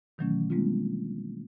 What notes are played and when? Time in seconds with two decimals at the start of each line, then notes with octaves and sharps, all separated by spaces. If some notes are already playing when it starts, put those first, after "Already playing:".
0.18 B2 D#3 E3 F#3 A3 C#4
0.50 G3 G#3 A#3 C4 D4 F4